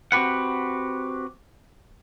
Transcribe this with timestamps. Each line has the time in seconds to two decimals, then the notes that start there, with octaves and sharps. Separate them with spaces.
0.12 C4 F#4 G4 B4 F#5